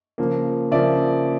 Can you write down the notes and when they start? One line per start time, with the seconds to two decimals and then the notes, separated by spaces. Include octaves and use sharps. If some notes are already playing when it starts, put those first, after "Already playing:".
0.18 C#3 F3 A#3
0.71 C#3 F3 A#3 D5 E5